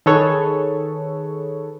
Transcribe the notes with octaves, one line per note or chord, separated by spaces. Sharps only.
D#3 G#4 A4 B4 C#5